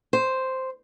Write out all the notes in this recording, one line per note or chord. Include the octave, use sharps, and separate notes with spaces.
C5